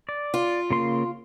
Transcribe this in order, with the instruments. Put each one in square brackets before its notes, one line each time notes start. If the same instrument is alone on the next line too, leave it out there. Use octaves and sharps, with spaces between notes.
[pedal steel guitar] D5
[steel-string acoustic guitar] F4
[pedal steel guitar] C#3 A#3 C6